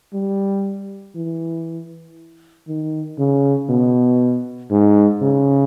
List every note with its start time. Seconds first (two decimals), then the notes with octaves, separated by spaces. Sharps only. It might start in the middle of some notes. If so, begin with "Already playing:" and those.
0.13 G3
1.15 E3
2.67 D#3
3.18 C#3
3.69 B2
4.71 G#2
5.22 C#3